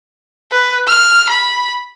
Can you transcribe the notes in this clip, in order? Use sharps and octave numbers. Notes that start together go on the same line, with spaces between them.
B4
F6
B5